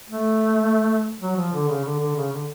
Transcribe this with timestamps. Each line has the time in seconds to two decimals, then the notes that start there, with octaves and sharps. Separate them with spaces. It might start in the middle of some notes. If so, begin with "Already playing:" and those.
0.10 A3
1.21 F#3
1.36 F3
1.53 D3
1.68 C#3
1.84 D3
2.00 D3
2.15 C#3
2.32 D3